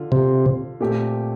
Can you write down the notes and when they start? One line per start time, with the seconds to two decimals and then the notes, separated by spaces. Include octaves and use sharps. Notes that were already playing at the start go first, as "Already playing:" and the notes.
Already playing: D3 F4
0.12 C3
0.80 A#2 A3 C4 G4